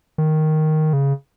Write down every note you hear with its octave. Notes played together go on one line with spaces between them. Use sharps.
D#3
C#3